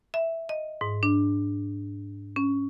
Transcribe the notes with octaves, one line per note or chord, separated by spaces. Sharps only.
E5
D#5
G#2
D4
C#4